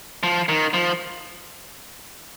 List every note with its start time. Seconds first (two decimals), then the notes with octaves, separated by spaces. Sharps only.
0.23 F3
0.49 D#3
0.74 F3